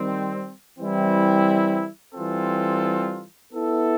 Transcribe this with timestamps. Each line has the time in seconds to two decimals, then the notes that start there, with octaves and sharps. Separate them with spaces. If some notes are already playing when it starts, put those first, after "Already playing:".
Already playing: D#3 G3 C4
0.78 E3 G3 C4 E4
2.13 E3 G3 C4 F4 A4
3.51 B3 E4 A4